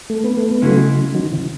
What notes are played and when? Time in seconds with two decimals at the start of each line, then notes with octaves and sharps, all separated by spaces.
0.10 A3
0.24 B3
0.37 A3
0.51 B3
0.62 C#3 F#3 G#3 A3 C#4 E4
1.14 D#3 F#3
1.32 C#3 E3